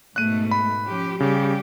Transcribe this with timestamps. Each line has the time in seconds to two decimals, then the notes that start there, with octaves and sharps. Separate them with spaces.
0.16 G#2 B2 A3 F#6 D#7
0.51 B5
0.85 F3 C#4 G4
1.20 C#3 G3 C#4 G4